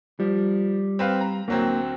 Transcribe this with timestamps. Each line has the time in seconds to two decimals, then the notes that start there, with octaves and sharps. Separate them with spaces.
0.20 F3 G3
0.99 C4 B4 F5
1.21 A#5
1.48 D2 F#3 A#3 C4